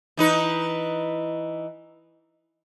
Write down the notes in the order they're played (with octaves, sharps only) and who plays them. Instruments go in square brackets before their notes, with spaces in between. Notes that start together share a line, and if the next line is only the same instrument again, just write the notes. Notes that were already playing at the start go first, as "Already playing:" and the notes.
[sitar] E3 D#4 B4